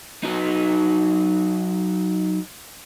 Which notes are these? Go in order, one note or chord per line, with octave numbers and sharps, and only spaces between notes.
F#3 D#4